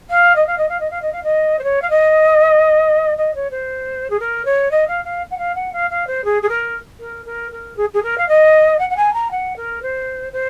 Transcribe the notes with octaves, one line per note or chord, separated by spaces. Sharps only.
F5
D#5
F5
D#5
F5
D#5
F5
D#5
F5
D#5
C5
C#5
F5
D#5
D#5
C#5
C5
G#4
A#4
C#5
D#5
F5
F5
F#5
F5
F#5
F5
F5
C5
G#4
G#4
A#4
A#4
A#4
A#4
G#4
G#4
A#4
F5
D#5
F#5
F#5
G#5
A#5
F#5
A#4
C5
C5